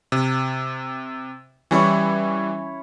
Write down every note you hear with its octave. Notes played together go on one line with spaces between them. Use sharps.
C3
E3 G3 C#4 E4 C#5